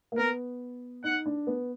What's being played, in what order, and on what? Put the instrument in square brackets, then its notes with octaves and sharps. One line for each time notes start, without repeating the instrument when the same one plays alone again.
[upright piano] A#3
[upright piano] B3 [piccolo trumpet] A#4
[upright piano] D#4 [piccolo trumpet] F#5
[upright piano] D4
B3